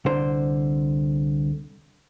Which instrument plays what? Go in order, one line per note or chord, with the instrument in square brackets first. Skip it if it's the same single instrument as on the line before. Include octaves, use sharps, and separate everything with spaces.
[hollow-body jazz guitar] C2 D3 C5